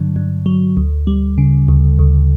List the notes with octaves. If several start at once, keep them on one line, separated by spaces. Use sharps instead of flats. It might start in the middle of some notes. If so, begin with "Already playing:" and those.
Already playing: G2 D3 F#3
G2
F#3
D2
G3
C#3
D2
D2